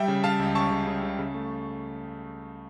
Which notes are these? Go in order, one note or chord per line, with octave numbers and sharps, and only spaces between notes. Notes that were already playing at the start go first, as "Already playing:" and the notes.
Already playing: G3 E5 G5
C#3
C#3 F5 A5
C#2
C#3 A5 C#6
C#3
C#3
C#3
C#3
A3